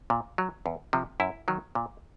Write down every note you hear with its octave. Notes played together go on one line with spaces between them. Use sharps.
A#2
F#3
E2
C3 F3
F#2 E4
D#3 F#3
A#2